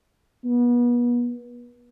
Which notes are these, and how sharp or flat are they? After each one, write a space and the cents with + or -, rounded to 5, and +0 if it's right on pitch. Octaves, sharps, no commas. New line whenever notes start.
B3 -35